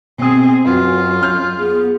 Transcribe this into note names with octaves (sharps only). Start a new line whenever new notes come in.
B2 C4 G#4 D#6
F#2 F4 F#4 B4
F6 G6
B3 G#4